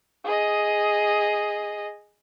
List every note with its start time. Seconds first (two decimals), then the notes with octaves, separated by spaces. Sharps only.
0.25 G#4 D#5